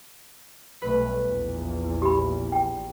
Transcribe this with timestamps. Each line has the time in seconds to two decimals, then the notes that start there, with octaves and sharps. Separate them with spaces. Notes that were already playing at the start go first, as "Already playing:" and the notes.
0.82 B1 G3 A3 B4
1.20 A#1 E2
2.02 G4 B5
2.52 G5